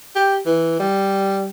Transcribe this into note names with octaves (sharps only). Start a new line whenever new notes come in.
G4
E3
G3